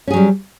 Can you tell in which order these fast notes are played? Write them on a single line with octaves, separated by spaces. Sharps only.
C#4 G#4 F#3 G3